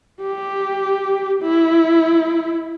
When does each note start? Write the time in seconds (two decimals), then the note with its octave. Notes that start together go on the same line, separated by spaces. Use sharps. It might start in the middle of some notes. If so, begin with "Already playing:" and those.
0.21 G4
1.43 E4